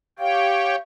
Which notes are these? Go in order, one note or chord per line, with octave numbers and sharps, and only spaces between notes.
G4 C#5 F5 G5